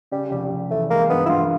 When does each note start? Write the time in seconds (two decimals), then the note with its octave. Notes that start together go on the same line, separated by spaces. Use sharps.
0.12 C#3 G3
0.31 F1 G3
0.51 F1
0.71 E2 A3
0.90 G#3 A#3
1.10 G2 B3
1.26 E4
1.29 G2 F4